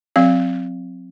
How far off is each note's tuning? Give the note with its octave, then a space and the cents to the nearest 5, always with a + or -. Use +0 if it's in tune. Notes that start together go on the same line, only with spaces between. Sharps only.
F#3 -30 C4 +0 F5 -5